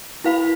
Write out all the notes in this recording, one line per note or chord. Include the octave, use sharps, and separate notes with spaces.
E4 B4 F5 B5